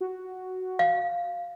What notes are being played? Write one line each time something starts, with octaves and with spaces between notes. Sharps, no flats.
F#4
F5